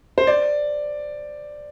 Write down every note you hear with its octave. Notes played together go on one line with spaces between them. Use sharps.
C5
D5